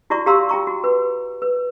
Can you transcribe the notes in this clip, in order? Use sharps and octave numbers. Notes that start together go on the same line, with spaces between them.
E4 F#4 D5 A#5 C#6
G4 F5 A#5 C6 E6
F4 G5 A#5 C#6
F#4
B4
B4